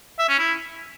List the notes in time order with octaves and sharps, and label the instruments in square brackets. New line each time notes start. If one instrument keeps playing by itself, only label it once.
[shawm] E5
C#4
E4